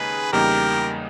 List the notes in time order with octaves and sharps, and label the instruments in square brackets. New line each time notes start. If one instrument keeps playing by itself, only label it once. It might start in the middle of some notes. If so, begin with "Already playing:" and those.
Already playing: [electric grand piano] D#2 C#3 G#3 D#4 [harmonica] G#4 B4
[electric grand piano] E2 C#3 G3 A#3 D#4 [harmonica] G4 A#4